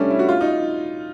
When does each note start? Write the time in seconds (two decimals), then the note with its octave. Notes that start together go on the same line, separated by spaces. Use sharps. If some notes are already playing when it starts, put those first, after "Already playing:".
Already playing: G3 A3 C#4 D4
0.10 E4
0.19 F#4
0.29 F4
0.41 D#4